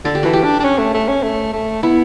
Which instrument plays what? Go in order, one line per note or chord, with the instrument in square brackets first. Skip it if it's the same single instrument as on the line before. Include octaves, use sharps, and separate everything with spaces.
[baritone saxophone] D3 [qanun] A4
[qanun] G4
[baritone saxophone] E3 [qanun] F#4
[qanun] G4
[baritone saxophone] D4
D4
C#4
A3
A3
C#4
A3
A3
[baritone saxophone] B3 [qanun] E4